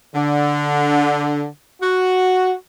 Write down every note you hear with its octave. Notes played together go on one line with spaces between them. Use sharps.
D3
F#4